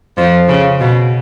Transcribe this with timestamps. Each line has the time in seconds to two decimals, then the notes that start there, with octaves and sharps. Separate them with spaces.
0.18 F2 F3
0.49 C#3
0.80 B2